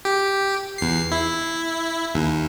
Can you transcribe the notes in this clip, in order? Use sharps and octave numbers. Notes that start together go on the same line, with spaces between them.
G4
E2 C7
E4
D#2